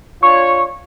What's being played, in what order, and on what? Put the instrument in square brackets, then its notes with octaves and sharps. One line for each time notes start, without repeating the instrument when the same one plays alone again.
[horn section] D4 F4 C#5 [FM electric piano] C#6